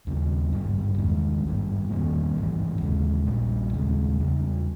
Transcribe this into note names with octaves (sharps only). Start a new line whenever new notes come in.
D#2 C#3 G3
G#1 G2 G3
E2 D#3 G#3
G#1 G2 G3
E2 D#3 G3 A#3
G#1 G2 E3
D#2 C#3 G#3
A#1 A#2 G3
D#2 C#3 G#3
E2 C#3 G3